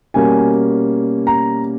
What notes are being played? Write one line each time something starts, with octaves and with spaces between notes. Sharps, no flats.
B2 G3 A#3 C#4 G#5
A#5